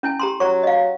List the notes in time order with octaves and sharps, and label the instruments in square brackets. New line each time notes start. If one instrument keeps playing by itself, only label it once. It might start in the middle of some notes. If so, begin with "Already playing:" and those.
[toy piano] C#4 E4 G#5
G4 A#5 C6
[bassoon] F#3 [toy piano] C#5 A#5 C#6
[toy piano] D#5 F5